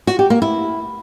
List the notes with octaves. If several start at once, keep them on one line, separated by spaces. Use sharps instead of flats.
F#4
G4
A#3
E4